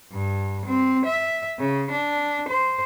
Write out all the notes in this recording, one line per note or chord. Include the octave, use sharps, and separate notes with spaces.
G2
C4
E5
C#3
D4
C5